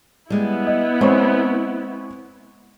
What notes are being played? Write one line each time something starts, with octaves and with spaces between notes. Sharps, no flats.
G3 G#3 B3 E4
D#5
G#3 C4 C#5 C#6